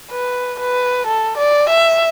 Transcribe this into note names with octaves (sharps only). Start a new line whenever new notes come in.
B4
B4
A4
D5
E5